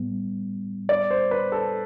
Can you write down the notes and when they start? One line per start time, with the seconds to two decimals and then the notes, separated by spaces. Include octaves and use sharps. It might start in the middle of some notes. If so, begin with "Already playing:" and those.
Already playing: A2 G3 B3
0.89 D5
1.11 C5
1.31 B4
1.52 A4